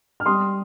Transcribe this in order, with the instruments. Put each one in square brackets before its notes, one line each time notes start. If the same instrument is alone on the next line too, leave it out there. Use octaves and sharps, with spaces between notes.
[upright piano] F6
G3 C6 D#6